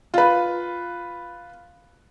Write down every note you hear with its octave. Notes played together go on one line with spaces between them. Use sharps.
F4 B4